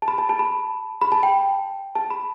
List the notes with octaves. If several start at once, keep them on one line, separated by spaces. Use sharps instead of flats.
A5
B5
A5
A5
B5
B5
A5
G5
A5
B5